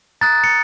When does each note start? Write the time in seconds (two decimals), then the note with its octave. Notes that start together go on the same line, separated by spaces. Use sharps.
0.21 A#5 D#6 F#6 A6
0.44 C#7